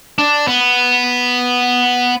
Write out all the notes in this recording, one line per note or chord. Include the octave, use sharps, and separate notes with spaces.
D4
B3